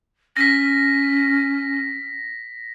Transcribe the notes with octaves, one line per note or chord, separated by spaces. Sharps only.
C#4 A#6 B6